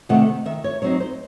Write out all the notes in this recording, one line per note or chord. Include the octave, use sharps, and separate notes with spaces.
C3 D#3 A3 F#5
D#3 E5
C#5
F#3 C4 D#4 C#5
C5